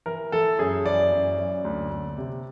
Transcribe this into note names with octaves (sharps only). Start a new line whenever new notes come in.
E3 A#4
E3 A4
F#2 G#4
E3 D5
F#2
F#2
D2
D2
C3